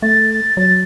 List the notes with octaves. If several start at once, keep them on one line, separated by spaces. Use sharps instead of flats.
A3 A6
A6
F#3 A6